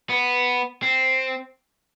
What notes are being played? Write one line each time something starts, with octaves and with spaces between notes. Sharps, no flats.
B3
C4